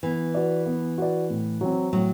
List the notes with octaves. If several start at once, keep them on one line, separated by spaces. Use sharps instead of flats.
E3 B3
F#4 B4 D5
B3
F#4 B4 D5
A2
F#3 C4
A2 F#3